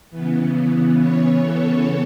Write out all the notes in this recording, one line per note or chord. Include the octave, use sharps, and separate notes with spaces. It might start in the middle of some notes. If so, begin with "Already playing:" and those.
C#3 E3 B3
C#5
A4